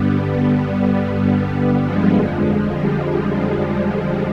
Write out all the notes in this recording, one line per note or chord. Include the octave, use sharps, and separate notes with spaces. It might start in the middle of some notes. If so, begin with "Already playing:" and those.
Already playing: G2 D3 G3 B3
G3
G3
G3 B3
F3 G#3
F2 D3 F3 G#3
G3
G3